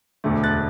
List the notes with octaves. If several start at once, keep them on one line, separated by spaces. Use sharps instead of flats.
E1 D2 D3 A3
F#6 A6